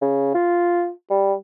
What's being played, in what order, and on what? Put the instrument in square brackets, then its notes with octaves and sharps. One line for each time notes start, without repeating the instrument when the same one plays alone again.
[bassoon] C#3
F4
G3